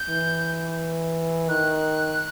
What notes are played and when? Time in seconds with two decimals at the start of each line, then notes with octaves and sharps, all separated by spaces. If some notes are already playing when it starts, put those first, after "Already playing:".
Already playing: G6
0.09 E3
1.49 D#3 F#6